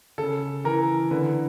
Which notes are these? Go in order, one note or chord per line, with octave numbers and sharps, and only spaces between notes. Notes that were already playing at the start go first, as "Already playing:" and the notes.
C#3 A4
E3 A#4
D3 B4